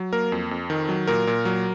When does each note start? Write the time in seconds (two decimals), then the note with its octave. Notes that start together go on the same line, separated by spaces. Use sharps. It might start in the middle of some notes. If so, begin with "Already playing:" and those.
Already playing: F#3
0.13 A#3 A#4
0.32 F2
0.51 F2
0.70 D#3
0.89 F#3
1.07 A#2 A#4
1.27 A#2
1.45 F#3